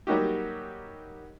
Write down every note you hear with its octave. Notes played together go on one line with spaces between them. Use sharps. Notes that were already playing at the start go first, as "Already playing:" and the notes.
F#3 G3 A#3 D#4 F#4 G4